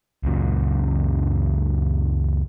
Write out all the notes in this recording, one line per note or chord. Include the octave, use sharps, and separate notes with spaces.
C#2 F#2 A#2